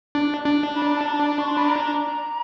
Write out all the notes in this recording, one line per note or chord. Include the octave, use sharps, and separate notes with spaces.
D4
D4
B5
A#5
A5
A#5
A5
C#6
C6
B5
A#5